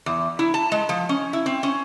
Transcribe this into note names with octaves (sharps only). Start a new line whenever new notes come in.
E2
E4
A5
G#3
F3
C#4
E4
C4
C#4